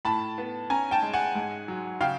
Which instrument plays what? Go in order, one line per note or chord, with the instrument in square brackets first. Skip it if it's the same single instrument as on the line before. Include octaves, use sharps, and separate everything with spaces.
[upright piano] A2 A5 B5
B3
C#4 G#5 A#5
G5 A5
G#3
F#5 G#5
G#2
F#3
C#3 F5 G5